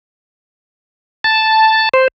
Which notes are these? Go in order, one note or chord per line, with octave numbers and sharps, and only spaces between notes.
A5
C5